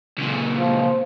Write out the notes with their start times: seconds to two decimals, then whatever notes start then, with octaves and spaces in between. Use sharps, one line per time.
0.18 C#2 A#2
0.59 F3